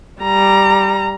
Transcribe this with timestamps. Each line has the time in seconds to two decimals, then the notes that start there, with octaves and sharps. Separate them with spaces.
0.22 G3 A#5